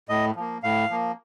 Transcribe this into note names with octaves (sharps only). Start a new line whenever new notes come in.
A2 D#5
F3 A#3
A2 F5
F3 A#3